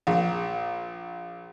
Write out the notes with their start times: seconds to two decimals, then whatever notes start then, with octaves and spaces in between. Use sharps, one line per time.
0.07 A#1